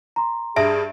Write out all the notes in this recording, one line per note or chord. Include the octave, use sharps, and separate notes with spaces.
A#5 C6
G2 G#4 E5 D7